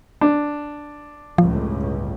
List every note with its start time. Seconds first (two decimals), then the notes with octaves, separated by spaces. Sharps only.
0.21 D4
1.38 G1 C#2 A2 F3